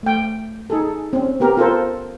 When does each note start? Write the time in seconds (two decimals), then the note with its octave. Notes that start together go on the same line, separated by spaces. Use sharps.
0.03 A3 G5
0.70 D#4 G#4 A4
1.13 C4 C#4
1.40 B3 G4 A#4
1.57 F4 A4 A#4 C5